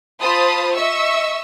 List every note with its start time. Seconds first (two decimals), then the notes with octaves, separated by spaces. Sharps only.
0.20 F4 C5 A5 B5 D#6
0.74 D#5 E5 C#6 E6